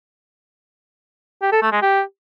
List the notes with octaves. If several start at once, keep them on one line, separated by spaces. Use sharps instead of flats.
G4
A4
A3
G#3
G4